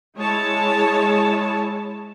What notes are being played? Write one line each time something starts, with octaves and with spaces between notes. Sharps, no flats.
G#3 E4 C#5 A5